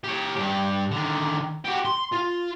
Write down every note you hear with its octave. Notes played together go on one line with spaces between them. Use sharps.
G4 C#5
G2 G4
D3 D#3
F#4 G4
C6
F4